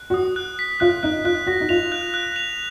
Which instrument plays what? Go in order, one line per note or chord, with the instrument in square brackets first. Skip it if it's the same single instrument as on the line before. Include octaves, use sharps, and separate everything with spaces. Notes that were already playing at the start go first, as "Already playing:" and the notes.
Already playing: [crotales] F#6
[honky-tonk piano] F#4 [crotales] D#6
[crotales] F#6
B6
[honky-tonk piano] F4 [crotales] F#6
[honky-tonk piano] D#4 [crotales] F#6
[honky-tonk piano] F4 [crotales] F#6
[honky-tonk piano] F#4 [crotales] A#6
[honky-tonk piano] D#4
[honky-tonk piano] F4 [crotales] F7
[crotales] F#6
F#6
F7